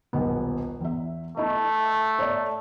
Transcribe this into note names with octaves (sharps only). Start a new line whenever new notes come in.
D#1 B1 B3
E2 E5
A3 E4 D#5
C#5 D5